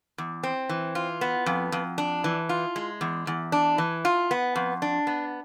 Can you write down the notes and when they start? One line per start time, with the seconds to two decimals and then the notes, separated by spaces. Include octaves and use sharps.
0.18 E2
0.43 C4
0.69 E3
0.95 F4
1.21 B3
1.46 F2
1.72 F2
1.98 D4
2.24 E3
2.49 F4
2.76 G#3
3.01 E2
3.27 E2
3.52 D4
3.78 E3
4.05 F4
4.31 B3
4.56 F2
4.82 D4
5.07 B3